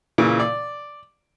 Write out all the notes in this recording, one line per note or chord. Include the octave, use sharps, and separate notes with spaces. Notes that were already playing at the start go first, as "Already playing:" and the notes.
A#2 C#3 E3
D5